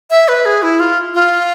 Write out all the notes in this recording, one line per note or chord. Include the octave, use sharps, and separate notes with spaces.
E5
B4
G#4
E4
F4
F4